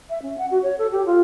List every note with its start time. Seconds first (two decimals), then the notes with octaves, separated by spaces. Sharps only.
0.10 E5
0.22 C#4
0.38 F#5
0.51 F#4
0.63 C#5
0.78 A4
0.92 G4
1.06 F4